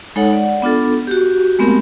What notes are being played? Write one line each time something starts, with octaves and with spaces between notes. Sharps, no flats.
G#3 D#4 A4 C#5 F#5
D5 F#5
B3 D4 F4 A4
F#4 G4
G#3 A3 B3 C4 G4 A#4